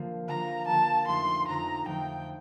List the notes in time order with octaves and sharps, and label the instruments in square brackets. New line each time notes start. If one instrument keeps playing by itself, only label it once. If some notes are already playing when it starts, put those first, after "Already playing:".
Already playing: [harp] D3 F3 A#3
[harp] D3 F3 A#3 [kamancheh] A#5
[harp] D3 F3 A#3 [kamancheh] A5
[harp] F2 D3 A3 D#4 A4 [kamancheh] C6
[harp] F2 D3 A3 D#4 A4 [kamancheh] A#5
[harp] F2 D3 A3 D#4 A4 [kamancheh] G5